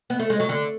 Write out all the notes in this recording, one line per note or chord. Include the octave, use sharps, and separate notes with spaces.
B3
A3
G#3
F#3
D3